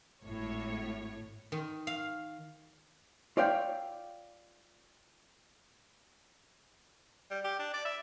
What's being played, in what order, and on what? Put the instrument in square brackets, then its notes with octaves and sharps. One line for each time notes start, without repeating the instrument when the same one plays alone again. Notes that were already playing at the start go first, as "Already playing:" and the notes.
[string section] G#1 A2 C#5
[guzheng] D#3
F5
[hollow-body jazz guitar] F4 C#5 D5 E5 F5 G5
[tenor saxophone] G3
G4
D4
D5
E5